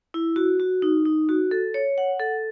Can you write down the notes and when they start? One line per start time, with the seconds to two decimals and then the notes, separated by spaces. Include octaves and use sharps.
0.14 E4
0.36 F#4
0.60 F#4
0.82 D#4
1.06 D#4
1.29 F#4
1.51 A4
1.74 C#5
1.98 F#5
2.19 A4